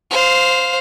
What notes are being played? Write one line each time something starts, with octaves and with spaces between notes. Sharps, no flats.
C5 F5